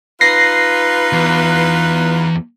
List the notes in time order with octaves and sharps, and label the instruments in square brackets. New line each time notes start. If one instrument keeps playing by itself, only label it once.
[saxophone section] D#4 F4 B4 [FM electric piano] A#6 C7
[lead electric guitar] E2